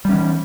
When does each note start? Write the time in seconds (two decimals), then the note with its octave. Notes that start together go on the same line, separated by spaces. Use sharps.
0.05 G3
0.09 C#4
0.13 E3